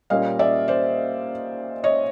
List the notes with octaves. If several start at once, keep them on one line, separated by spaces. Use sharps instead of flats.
A#2 G3 A#3 C#4 D#5 F5
D5 E5
C5 D5
C#5 D#5